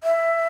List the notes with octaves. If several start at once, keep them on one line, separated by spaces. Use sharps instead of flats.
E5